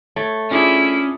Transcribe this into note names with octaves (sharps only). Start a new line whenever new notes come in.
A3 C#5
C#4 D4 E4 F4 G#4